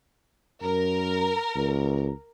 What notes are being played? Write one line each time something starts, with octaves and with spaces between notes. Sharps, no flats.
F#2 A#4
C#2